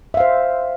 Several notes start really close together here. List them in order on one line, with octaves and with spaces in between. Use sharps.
E5 F5 C5